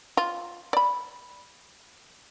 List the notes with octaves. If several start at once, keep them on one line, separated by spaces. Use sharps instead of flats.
F4
D5 B5